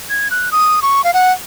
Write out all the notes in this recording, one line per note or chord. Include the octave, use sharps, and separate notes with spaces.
G#6
F#6
D#6
C#6
F5
F#5